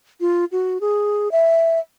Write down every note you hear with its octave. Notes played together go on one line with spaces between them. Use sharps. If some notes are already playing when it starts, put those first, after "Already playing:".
F4
F#4
G#4
E5